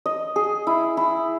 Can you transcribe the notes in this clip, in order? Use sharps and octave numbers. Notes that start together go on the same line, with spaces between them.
D#5
G#4
E4
E4